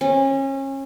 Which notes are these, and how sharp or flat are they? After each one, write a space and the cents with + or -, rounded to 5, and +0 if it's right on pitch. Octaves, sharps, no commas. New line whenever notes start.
C#4 -30